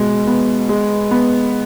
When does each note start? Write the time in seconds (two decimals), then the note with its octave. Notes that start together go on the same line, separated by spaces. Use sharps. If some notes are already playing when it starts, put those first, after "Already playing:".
Already playing: B2 G#3
0.27 B3
0.69 G#3
1.11 B3